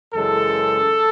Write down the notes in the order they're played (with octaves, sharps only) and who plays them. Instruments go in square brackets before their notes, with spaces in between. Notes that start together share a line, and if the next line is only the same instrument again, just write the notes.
[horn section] F#2 C#3 E3 G#3 A4